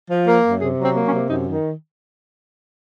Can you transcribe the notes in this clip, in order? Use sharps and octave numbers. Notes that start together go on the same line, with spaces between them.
F3
A#3
F#2
C3 G#4
F#3
C4
A#3
C#4
C3
F#2 D#4
D#3